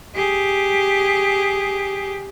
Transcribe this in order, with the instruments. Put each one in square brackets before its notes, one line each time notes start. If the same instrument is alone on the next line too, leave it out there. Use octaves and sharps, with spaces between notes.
[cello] G4 G#4